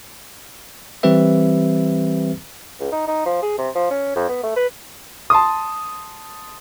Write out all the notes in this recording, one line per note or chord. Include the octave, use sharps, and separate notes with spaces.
E3 G3 C4 G4 B4 E5
C#2
D#4
D#4
F3
G#4
C3
F3
C#4
F2
B3
A3
B4
A5 C6 D#6